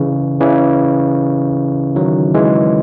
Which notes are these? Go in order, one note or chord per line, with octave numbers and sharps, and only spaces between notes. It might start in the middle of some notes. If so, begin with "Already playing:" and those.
Already playing: C#3 E3
C#3 E3
D#3 F#3
E3 G#3